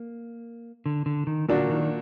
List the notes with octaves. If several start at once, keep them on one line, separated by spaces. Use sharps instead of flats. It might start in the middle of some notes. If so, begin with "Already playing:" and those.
Already playing: A#3
D3
D3
D#3
A#2 D3 F#3 D4 F#4
D#3